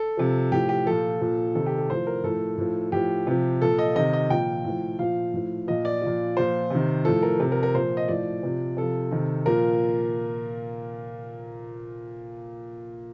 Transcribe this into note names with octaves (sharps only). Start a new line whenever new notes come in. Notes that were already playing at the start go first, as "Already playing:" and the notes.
Already playing: A4
C3 F3
A2 F3 G4
G4
A#2 F3 A4
A#2 F3
C3 D#3 A4
G4
A4
A2 F3 C5
A#4
A2 F3 A4
A2 F3
A2 F3 G4
C3 F3
A#2 F3 A4
D#5
C3 D#3 D#5
D#5
A#2 F3 G5
A2 F3
A#2 F3 F5
A2 F3
A#2 F3 D#5
D5
A#2 F3
A#2 F3 C5
C3 D#3
A2 F3 A4
A#4
C3 F3
A#4
A#4
A#2 F3 C5
D#5
A2 F3 D5
C3 F3
C3 F3 A4
C3 D#3
A#2 F3 A#4